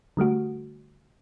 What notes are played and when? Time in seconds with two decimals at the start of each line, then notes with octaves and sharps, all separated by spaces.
0.17 D3 G3 A3 F#4